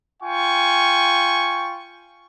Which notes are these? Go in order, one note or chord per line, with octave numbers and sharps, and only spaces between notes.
F4 G5 G#5 C#6